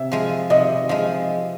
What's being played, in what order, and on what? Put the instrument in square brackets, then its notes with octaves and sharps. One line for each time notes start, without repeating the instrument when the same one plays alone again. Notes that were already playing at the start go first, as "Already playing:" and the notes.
Already playing: [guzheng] C3 [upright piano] E5
[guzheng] F3 G#3
[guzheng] C3 [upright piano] D#5
[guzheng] F3 G#3